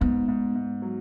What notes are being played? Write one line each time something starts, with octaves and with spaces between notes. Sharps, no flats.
G#2 B3
G#2
G#2
F#3